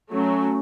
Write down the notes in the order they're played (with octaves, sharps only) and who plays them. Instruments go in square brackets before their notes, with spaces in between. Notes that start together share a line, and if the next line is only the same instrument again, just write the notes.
[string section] F#3 A3 [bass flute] C#4